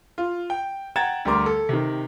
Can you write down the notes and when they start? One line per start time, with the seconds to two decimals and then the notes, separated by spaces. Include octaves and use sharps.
0.18 F4
0.50 G5
0.96 F#5 G5 A#5 G#6 A6 E7
1.25 D2 G3 A#4 C6 D6
1.46 A4
1.69 C3 D#3